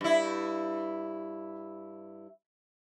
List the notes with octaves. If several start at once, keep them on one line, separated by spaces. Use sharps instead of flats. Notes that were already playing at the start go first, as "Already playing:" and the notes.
G2 E4